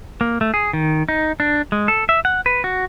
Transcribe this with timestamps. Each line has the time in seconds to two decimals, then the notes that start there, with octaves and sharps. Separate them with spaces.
0.21 A#3
0.41 A3
0.54 G#4
0.73 D#3
1.09 D#4
1.40 D4
1.72 G#3
1.88 A4
2.09 E5
2.25 F#5
2.46 B4
2.64 F#4